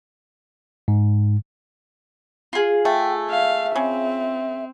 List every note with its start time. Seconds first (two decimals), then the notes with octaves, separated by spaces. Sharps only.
0.88 G#2
2.53 F4 G#4
2.85 A3 G5
3.30 E5 F5
3.76 C#3 C4